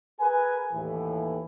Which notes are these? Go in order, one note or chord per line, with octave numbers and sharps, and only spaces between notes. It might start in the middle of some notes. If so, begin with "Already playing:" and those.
G#4 A#4 B4 G#5
D#2 A2 E3